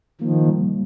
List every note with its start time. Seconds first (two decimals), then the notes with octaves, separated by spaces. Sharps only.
0.21 D#3 F3 A#3
0.48 G3